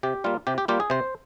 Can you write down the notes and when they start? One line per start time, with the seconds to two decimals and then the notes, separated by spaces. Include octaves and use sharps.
0.03 C3 G4
0.24 G3 A#3 F4
0.47 C3 G4
0.58 G4
0.68 G3 A#3 F4 G4
0.80 G#4
0.90 C3 C5